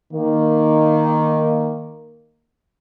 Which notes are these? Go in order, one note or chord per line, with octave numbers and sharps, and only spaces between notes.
D#3 A#3